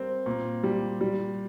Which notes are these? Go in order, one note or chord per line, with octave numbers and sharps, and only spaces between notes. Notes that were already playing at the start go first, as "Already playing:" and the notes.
Already playing: G3 A#3 C4
A#2
G3
G3